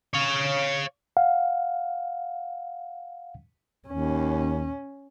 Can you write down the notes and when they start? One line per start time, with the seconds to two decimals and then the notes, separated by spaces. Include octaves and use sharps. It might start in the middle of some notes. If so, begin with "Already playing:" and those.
0.14 C#5 F5
1.17 F5 F#5
3.88 D#2 C#4